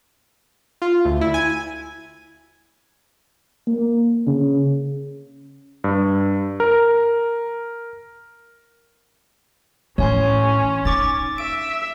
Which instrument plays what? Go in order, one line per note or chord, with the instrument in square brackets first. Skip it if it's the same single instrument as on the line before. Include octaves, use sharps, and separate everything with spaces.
[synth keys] F4
D2
E4
G#5
[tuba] A#3
C#3
[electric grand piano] G2
A#4
[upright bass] A1 [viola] C#4 [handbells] C#5 G#5 C6
[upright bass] D#4 [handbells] C#6 D6 A6
[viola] E5 [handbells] D7